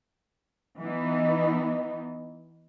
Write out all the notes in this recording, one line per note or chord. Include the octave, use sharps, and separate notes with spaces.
E3 B3 D#4